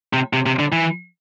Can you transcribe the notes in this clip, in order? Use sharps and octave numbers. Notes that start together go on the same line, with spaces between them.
C3
C3
C3
D3
E3